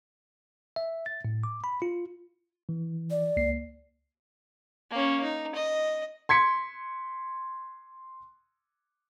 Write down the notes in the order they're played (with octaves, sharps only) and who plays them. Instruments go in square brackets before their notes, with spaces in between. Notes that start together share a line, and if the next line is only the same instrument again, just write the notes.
[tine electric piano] E5
A6
A2
D6
B5
F4
E3
[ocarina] D5
[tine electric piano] C#2 A#3 C7
[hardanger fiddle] A#3 C#4
D#4
D#5
[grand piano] C6 G#6 B6 C#7